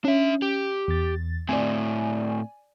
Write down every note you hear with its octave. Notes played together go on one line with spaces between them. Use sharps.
C#4 D4 E5
G4
E2 A6
A2 C4 D5 G#5